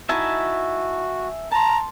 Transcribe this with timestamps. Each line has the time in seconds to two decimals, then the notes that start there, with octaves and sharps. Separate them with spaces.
0.09 D#4 E4 F#4 E5 G#5 A5
1.52 A5 A#5 C6